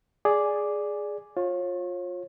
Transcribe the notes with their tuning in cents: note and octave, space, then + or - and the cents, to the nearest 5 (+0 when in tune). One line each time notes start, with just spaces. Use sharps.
G#4 +0 D5 +0
F4 +20 C#5 -35